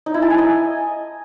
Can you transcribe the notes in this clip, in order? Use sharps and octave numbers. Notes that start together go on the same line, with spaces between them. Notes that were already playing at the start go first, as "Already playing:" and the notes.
D#4
E4
A5
G#5
D#5